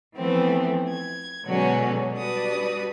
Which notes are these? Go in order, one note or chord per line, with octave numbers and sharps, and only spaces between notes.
E3 F3 A3 B3 C4
G#6
B2 D3 F#3 G#3 C#4 F#4
G3 D4 F#4 G4 B4 D#6